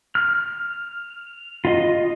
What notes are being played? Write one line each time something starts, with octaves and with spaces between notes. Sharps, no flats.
F6
F4 D#5